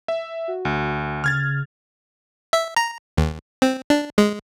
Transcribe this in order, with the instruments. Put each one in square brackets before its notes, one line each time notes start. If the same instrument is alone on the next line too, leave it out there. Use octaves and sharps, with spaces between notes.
[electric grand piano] E5
[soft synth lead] F#4
[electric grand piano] D2
[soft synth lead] C#3 [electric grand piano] F6 G#6 A6
[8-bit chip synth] E5
A#5
D#2
C4
D4
G#3